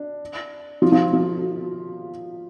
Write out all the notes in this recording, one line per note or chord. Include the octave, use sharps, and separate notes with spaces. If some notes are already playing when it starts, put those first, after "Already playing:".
Already playing: D4
F3 F4
F3 F4
F3 F4